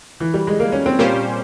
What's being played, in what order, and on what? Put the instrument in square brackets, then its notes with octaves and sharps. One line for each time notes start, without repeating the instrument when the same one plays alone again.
[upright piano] E3
G3
G#3
A#3
C#4
C4
[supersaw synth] A#2 G3 C#4 G4 C5 [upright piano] A#3